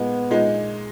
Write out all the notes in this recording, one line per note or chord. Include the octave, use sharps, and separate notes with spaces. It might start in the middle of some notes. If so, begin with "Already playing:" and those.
Already playing: A#2 G#3 B3 D#4
A#2 G#3 D#4